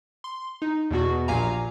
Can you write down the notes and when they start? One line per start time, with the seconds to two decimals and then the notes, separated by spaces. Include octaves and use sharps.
0.24 C6
0.62 D#4
0.91 E2 B2 B3 F#4
1.28 A#1 A#2 G4 F5 G#5 A#5